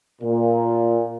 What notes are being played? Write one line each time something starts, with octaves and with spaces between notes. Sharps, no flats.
A#2